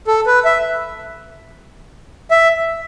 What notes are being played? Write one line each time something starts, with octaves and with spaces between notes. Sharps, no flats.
A4
B4
E5
E5